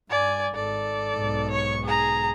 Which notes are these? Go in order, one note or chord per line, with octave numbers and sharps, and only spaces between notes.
G2 D5 G#5
G#1 A4 D5
B1 G#2
C#5 C#6
G#4 A#5